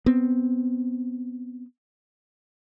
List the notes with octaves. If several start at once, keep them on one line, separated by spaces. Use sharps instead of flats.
B3 C4